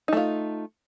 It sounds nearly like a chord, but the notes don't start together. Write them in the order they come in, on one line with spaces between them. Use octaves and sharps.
D#4 A3 F4